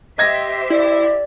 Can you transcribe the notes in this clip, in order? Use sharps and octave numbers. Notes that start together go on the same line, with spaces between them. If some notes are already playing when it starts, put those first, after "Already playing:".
G4 C5 D#5 E5 G#6 A#6
E4 D5